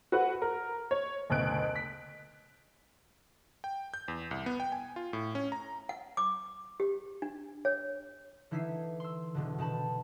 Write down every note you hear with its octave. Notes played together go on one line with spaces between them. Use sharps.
F#4 A4 B4 C5 F#5
A#4
C#5
F#1 D2 B2 F#6 D7
B6
G5
G6
E2
C2
B3
G5
G#5
F4
A2
C#4
A#5
F#5
D6
G4
D4
C#5
D3 E3 D#4 E4 B6 C7
C6 E6
E1 B2 D3
B2 D#3 A5 B5